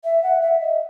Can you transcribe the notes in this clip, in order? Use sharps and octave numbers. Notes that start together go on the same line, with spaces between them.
E5
F#5
E5
D#5